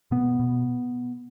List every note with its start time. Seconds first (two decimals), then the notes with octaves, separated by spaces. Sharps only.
0.11 B2 B3
0.40 B2